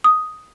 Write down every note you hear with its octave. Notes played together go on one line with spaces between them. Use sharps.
D#6